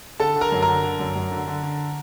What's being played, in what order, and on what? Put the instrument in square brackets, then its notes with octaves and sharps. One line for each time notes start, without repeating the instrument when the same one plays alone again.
[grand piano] D3 A4 A5
D3
A#4 A#5
F#2
A#4 A#5
D3
D3
F#2
F#2
D3
D3
D3